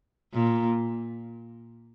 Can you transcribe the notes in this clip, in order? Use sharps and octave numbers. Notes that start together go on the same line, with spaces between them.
A#2